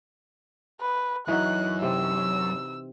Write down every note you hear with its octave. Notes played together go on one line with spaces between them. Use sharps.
B4
F#2 E3 D#4 F#4 F#6
C3 C4 E6